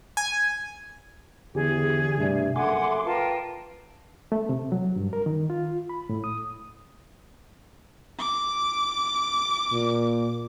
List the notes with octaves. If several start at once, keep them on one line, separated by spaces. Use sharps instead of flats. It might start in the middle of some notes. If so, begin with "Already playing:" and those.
G#5
E2 D3 G4 G#4
G2 C3 A3 D4 E5
F#1 A4 E5 F#5 G#5 B5 C6 D6
F4 A#4 B4 G5 A5
A3
C3
F#3
G2
A#4
D#3
F4
B5
A2
D#6
D6
A#2